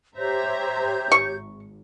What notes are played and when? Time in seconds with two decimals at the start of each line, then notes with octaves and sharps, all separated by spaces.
0.17 G4 C5 C#5 E5 A#5 G6
1.12 G#1 C#6